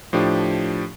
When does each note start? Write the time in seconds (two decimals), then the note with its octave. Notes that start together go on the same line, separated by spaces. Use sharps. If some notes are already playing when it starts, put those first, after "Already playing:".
0.13 A2 F3 D4 G4